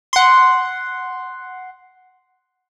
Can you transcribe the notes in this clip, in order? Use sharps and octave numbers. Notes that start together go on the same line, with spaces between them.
F#5 C6